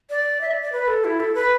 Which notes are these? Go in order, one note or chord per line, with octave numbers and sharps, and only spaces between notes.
D5
E5
D5
D5
B4
A4
E4
A4
B4